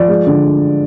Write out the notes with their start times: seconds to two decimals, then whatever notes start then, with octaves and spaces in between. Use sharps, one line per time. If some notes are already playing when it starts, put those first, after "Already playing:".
Already playing: F3 D5
0.08 G#3
0.27 D3